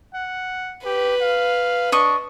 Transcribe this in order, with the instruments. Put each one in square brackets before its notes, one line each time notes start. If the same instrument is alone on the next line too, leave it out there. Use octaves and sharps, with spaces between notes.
[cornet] F#5
[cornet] G4 [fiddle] B4
[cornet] F5
[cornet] D4 [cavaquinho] D#5 C#6